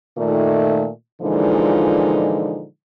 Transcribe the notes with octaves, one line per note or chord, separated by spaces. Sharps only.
A#2 D#3 A3
A#2 D3 E3 F3 G#3 D#4